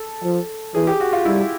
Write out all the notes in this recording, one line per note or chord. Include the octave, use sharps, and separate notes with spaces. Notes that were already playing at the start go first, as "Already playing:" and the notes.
Already playing: A4
F3
E3 G#4
G4
F#4
F4
G3 E4